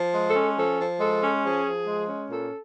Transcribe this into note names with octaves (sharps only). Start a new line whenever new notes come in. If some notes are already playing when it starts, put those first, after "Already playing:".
Already playing: F3
G#3
A4
C#4
F3 A4
F3
G#3 A4
C#4
F3 G#4
F3
G#3
C#4
A#2 A4